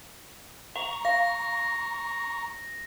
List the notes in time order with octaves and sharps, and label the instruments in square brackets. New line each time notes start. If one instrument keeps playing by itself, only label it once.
[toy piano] F#5 [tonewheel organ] A#5 C#6
[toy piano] F5 [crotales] A#6